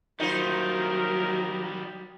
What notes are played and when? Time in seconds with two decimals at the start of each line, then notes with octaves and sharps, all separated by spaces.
0.20 D#3 F#3 G3 D#4 F4 A#4 C5